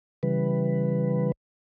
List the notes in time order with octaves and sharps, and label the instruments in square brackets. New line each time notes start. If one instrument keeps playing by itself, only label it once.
[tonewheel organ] C#3 E3 G3 B4